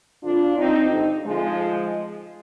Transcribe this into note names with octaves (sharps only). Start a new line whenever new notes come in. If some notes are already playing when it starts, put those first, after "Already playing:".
F2 D3 D4 F4
F2 D#3 C4 D#4
G2 D3
F2 D3 F3 G#3